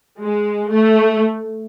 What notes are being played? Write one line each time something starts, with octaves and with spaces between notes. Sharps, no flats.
G#3
A3